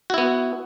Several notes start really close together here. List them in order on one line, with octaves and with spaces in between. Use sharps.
F#4 E4 B3